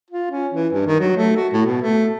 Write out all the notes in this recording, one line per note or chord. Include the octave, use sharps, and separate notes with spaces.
F4
C#4
E3
G2
D#3
F#3
A3
F#4
A2
B2
A3